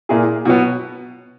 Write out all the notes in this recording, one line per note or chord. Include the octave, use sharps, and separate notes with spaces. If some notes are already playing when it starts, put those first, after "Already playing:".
A#2 A#3 E4 G#4
B2 F#3 B3